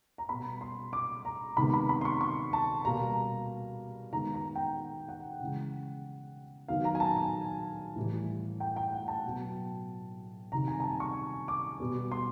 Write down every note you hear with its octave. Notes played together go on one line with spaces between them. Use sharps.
A#5
B2 G3 B3 B5
C6
D6
A#5
C3 D#3 G#3 B3 B5
B5
B5
C6
C#6
C#6
A5
B2 G3 A#3 A#5
D#3 G#3 B3 A#5
A#5
G5
F#5
C#3 E3 G#3
D#3 F#3 B3 F5
A#5
G#5
A5
G#5
A2 E3 G3
G5
G5
F#5
A5
B2 F#3 B3
C3 D#3 G3 A#5
G#5
G#5
A5
C#6
D6
B2 G3 B3
C6